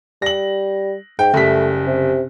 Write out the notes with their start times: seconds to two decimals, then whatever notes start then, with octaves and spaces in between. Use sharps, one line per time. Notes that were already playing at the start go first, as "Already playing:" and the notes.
0.22 G3 A#6 F#7
1.19 G#2 G5
1.34 F#1 G3 A3 B6
1.87 C3